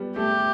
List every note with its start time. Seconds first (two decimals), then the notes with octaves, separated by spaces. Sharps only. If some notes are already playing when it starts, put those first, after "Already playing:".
Already playing: G3 B3
0.16 A3 G4